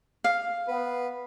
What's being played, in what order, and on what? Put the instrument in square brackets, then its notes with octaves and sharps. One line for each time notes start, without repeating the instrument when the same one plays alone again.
[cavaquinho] F5
[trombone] B3 [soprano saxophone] B4